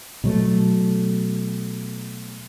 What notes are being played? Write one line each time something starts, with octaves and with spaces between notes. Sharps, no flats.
B2 F#3 A3